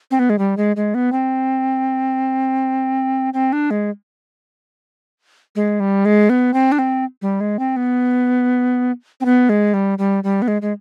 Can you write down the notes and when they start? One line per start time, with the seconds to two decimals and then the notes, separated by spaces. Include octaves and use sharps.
0.11 C4
0.19 B3
0.30 G#3
0.39 G3
0.57 G#3
0.76 G#3
0.94 B3
1.12 C4
3.34 C4
3.53 D4
3.71 G#3
5.56 G#3
5.80 G3
6.05 G#3
6.29 B3
6.54 C4
6.72 D4
6.79 C4
7.22 G3
7.41 G#3
7.59 C4
7.76 B3
9.21 C4
9.25 B3
9.49 G#3
9.74 G3
9.98 G3
10.24 G3
10.42 B3
10.48 G#3
10.62 G#3